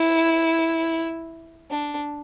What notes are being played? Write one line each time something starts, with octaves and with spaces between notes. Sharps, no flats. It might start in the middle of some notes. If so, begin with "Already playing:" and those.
Already playing: E4
D4